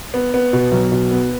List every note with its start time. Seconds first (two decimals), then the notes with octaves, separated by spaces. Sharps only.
0.14 B3
0.34 B3
0.53 B2
0.72 B1
0.92 B2
1.11 B3